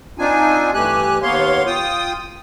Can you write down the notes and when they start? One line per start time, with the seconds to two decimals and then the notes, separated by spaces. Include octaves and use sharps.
0.19 C4 D4 D#4 F4 G#5
0.74 G2 E3 A3 G4 G#5 F#6
1.22 D#2 A#3 B3 C#5 F5 C6
1.66 F4 G5 D#6